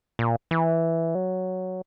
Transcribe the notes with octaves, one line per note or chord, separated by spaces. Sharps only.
A#2
E3
F#3